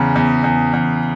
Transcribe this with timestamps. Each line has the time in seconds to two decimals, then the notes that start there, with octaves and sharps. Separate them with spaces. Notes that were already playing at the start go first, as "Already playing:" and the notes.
Already playing: E2 C#3
0.15 E2
0.44 E2
0.73 E2